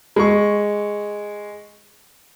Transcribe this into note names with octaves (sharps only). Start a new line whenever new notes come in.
G#3 C#6